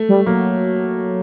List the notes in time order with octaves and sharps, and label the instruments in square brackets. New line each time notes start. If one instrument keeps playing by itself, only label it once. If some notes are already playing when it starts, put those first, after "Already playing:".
Already playing: [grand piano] A3
[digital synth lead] G3
[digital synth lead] F#3 [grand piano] A#3